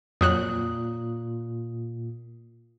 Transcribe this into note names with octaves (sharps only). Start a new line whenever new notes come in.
F2 A#2 F#3 D#6 F#6